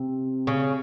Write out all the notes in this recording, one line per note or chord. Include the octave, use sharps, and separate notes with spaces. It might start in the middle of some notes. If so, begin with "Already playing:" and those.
Already playing: C3
C#3